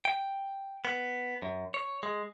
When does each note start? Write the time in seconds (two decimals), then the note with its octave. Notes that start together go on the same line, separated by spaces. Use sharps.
0.05 G5
0.85 B3
1.42 F#2
1.74 C#5
2.03 G#3